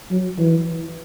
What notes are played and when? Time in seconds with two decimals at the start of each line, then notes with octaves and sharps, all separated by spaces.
0.11 F#3
0.38 E3